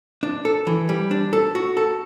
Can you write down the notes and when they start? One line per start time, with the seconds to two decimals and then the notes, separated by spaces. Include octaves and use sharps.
0.23 D4
0.45 A4
0.67 E3
0.89 G3
1.11 D4
1.33 A4
1.55 F#4
1.77 A4